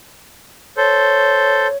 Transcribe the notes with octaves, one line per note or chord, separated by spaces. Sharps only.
A4 C5 C#5